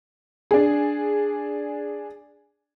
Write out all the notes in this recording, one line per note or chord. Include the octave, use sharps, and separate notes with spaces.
D4 G#4